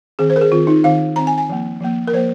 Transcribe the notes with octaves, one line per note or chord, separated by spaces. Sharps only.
D#3 C4 G#4
C5
A#4
G#4
D#3 C4 F4
D#4
D#3 C4 F5
D#3 C4 A#5
G#5
G#5
F3 A#3
F3 A#3
A#4
F3 A#3 C5